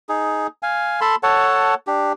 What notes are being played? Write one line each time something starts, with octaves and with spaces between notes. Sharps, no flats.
D#4 G#4
F5 G#5
A4 A5 B5 C6
A4 C#5 F#5 A5
D4 G4